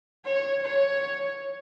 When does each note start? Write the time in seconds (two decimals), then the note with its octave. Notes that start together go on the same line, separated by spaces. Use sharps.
0.25 C#5
0.63 C#5